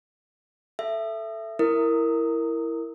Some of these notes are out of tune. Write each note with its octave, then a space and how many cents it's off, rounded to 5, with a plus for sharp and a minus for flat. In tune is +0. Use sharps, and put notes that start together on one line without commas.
A4 +0 E5 +15
E4 +5 A#4 -10 D#6 +0